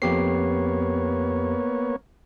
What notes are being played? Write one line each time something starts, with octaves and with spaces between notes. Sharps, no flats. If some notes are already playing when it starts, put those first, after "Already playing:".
F2 A#3 B3 G4 C#5 C7